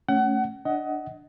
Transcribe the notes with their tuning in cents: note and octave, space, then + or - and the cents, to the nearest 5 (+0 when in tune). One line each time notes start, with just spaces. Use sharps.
A3 +0 C#4 +0 F#5 +30
D4 +5 D#5 +20 F#5 +15